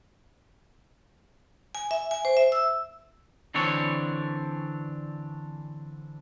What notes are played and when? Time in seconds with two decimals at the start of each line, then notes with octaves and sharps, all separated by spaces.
1.75 G#5
1.91 E5
2.11 G#5
2.25 C5
2.37 E5
2.52 E6
3.54 D3 E3 C4 D4 C#5